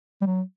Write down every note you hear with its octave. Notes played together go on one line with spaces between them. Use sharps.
G3
F#3